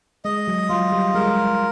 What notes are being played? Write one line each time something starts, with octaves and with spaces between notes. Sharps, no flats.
G#3 D#5
F#3
F#3 F4
G3
G#3 A#4